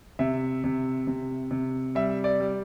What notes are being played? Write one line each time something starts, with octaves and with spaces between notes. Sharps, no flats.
C3 E5
C3
C3
C3
G3 E5
D5
G3